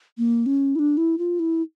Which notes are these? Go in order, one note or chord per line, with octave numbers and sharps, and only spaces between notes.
A#3
C#4
E4
D4
E4
F4
E4